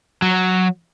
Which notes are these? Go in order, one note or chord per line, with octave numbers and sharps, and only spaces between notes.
F#3